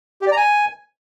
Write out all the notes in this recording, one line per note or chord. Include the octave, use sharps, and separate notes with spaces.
G4
D5
A#5
G#5